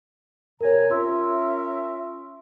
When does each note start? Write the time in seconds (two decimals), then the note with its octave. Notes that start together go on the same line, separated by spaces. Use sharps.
0.61 C3 A#4 C#5 G#5 A#5
0.90 C#4 F4 A#4 E5 C6 E6